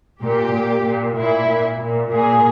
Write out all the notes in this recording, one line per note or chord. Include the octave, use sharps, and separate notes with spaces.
A#2 G4
A#2
A#2
A#2 E4
A#2
A#2
A#2 G#4